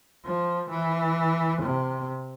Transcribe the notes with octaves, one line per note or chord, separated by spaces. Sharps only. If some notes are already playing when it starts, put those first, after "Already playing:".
F3
E3
C3